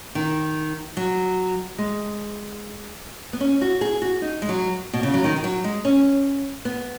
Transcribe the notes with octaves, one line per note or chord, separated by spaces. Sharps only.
D#3
F#3
G#3
B3
C#4
F#4
G#4
F#4
D#4
G#3
F#3
B2
C#3
F#3
D#3
D#3
F#3
G#3
C#4
B3